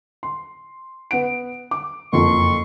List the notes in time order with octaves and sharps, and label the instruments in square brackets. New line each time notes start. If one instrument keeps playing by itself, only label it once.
[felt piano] C6
B3 F#5 D7
D6
[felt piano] F#1 F2 F3 [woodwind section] C6 C#6